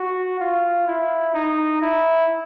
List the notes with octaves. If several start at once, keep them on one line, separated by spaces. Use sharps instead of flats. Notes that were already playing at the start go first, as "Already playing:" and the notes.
Already playing: F#4
F4
E4
D#4
E4